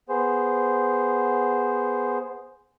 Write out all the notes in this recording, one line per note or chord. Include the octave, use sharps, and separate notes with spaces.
B3 G#4 C5